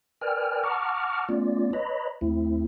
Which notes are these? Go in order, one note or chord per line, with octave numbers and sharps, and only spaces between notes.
A#4 B4 D5 G5 G#5 F6
F#5 A5 A#5 C#6 D6 F6
A3 B3 C#4 F4 D5
B4 C#5 D#5 A#5 B5
D#2 A3 C4 E4